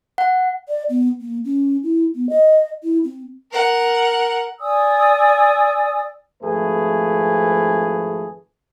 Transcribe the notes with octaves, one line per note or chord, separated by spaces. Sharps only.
F#5
D5
B3
A#3
C#4
E4
B3
D#5
E4
C4
A#4 F#5
D5 G#5 D#6 E6
G#1 F2 F3 A3 G#4 B4